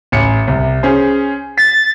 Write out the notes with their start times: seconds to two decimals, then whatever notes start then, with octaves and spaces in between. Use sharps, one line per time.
0.12 A1 C#7
0.48 C2
0.83 C#4 G#4 C5
1.58 A6 B6